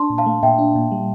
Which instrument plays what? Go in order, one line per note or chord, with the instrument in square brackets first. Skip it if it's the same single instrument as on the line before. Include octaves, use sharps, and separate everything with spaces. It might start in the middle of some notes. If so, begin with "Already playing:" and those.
Already playing: [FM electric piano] D4 [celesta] A5 C6
[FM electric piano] A#2
[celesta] F5 A5
[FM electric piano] A3
[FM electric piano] A#2 [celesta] E5 G5
[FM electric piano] D4
A#2
G3